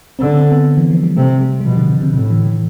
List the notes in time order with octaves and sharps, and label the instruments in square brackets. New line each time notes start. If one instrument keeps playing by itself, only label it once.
[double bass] D3 [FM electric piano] C4
[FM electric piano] C4
B3
E3
F3
G3
[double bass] C3 [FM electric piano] A3
[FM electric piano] G3
G3
[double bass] B2 [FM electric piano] F3
[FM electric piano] D3
C3
D3
C3
[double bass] A2 [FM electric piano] C3
[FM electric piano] E3
E3